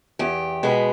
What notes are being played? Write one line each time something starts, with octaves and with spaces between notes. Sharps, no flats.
E2 G4
B2 G#3 B3